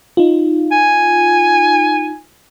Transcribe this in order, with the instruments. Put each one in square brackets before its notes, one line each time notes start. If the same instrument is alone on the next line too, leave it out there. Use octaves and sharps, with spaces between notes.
[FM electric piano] D#4 F4
[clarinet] G#5